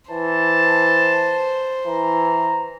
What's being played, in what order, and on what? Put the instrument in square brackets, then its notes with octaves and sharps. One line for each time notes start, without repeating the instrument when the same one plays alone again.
[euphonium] E3 [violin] C5 [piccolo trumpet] A5
[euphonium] E3 [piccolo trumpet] A#5